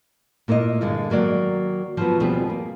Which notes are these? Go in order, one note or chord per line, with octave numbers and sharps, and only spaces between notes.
A#2 A#3 E4 C#5 D#5
G2 D3 G#3 A#3
D#3 F#3 A#3 D5 F#5
F3 F#3 B3
D#2 B2 F3 G3 C4 G#4
A#3